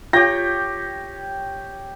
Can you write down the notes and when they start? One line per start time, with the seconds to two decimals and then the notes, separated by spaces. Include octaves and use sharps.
0.13 F4 G4 C#5 F5 G5 A#6